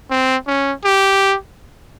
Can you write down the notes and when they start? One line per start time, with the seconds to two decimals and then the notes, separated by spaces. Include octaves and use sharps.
0.10 C4
0.47 C#4
0.85 G4